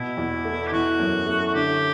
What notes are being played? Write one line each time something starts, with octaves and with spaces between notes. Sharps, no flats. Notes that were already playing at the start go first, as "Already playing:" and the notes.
Already playing: B2 E4
E2
A3
G4
E3 F#4
F#2
A3
F#4
D3 G4